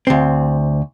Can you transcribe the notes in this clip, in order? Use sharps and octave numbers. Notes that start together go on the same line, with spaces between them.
D2 C4